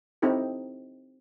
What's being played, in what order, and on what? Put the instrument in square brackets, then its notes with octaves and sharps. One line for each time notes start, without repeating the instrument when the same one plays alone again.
[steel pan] C4 D#4 E4 G4 A4